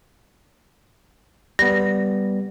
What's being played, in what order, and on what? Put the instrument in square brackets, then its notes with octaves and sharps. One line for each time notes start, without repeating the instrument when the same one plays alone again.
[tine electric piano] G3 B3 [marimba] A#6